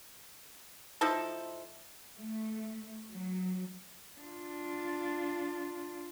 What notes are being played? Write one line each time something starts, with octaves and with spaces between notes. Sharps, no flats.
F3 D#4 E4 A4
A3
F#3
D4 F4